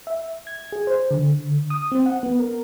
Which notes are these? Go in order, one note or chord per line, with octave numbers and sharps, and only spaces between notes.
E5
G#6
G#4
C5
D3
D#6
C4
F#5
B3
A#4